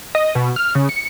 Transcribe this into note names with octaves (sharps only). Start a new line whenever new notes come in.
D#5
B2
F6
C#3
C#7